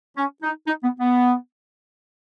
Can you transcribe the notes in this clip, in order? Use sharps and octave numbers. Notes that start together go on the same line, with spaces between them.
C#4
D#4
D#4
B3
B3